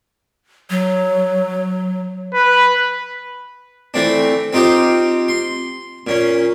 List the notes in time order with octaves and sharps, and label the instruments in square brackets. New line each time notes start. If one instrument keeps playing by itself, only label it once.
[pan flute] F#3
[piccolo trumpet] B4
[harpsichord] E3 A3 C4 D4
C4 D#4 F4 G4 C5
C6
A#2 C#4